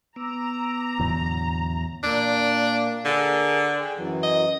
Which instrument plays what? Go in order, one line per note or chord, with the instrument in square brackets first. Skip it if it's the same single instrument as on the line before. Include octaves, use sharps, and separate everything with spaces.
[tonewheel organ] B3 D6 E6 [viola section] A#5
[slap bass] E2 A2 F#3 [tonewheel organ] D3
[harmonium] A#2 A#3 [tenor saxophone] D4
[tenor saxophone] D3 [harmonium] G#4 A#4
[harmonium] G#4 G5
F#2 E3 F#3
[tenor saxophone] D#5